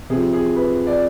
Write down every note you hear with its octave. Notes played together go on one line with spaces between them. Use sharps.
C3 F3 G#4
G#4
B4
D5